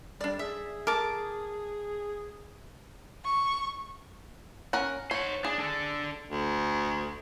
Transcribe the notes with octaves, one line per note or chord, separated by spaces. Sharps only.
G3 D4 D5
G#4 E5
A#4 A5 D6
C#6
C#4 A#4 F#5
C5 C#5 F#5
D4 G#4
D4 A4
D2